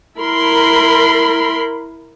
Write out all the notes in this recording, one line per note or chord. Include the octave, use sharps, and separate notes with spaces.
E4 A#4 B5 C6